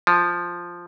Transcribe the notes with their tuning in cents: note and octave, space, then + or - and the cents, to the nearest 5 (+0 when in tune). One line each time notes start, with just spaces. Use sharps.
F3 +0